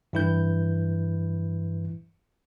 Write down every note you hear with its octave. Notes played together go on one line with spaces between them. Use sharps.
G2 E3 E4 B4 G6